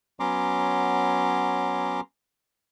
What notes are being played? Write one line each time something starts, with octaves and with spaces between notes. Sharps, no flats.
F#3 B3 C#4 A#5 C6 D6